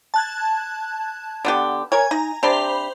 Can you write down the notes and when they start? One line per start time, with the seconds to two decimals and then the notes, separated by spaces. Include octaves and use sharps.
0.14 A5 F#6 G#6
1.45 D3 B3 G4
1.92 A#4 C#5 G#5
2.11 D#4 A#5
2.43 C3 D4 G4 C5 B5 F7